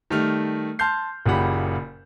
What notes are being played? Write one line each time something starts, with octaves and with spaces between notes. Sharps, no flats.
D#3 G3 A3 F6
A5 C6 F6 G6 C7
F#1 A#2 C#3 G4 F#5 B5